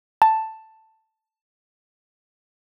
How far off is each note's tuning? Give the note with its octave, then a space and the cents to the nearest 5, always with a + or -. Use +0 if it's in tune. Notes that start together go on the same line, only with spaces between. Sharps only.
A5 +5